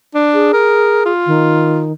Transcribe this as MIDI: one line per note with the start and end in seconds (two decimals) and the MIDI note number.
0.15 0.51 62
0.34 1.12 68
0.53 1.02 70
1.06 1.84 65
1.27 1.92 51